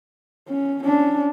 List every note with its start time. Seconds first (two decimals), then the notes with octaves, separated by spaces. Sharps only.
0.49 C#4
0.83 C#4 D4